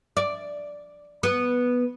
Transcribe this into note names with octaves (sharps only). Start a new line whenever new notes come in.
D5
B3